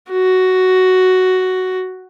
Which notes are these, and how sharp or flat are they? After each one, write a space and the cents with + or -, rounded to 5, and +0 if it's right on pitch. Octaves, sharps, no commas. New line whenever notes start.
F#4 +5